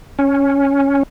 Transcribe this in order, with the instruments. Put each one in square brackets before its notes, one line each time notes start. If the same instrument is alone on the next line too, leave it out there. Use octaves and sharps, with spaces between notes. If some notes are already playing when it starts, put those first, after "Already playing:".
[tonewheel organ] C#4